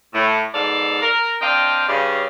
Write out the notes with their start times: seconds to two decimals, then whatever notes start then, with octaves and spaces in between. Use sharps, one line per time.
0.14 A2
0.54 G#2 B2 A4 D5 F5
1.02 A#4
1.41 C4 D4 D#5 F5 G5
1.88 G2 C#3 D5